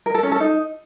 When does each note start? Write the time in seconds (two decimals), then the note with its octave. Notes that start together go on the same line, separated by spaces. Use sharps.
0.06 A#4
0.15 A4
0.23 C#4
0.32 A4
0.40 D#4